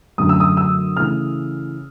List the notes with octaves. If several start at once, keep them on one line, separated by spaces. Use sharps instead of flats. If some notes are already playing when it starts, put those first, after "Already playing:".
F#2 D3 F#3 A3 D#6
E6
D#6
E6
C#3 E3 A3 F6